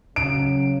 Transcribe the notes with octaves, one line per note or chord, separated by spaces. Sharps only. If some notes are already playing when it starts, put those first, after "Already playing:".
C#3 F#3 D7